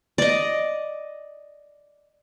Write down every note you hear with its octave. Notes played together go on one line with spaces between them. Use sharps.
D5 D#5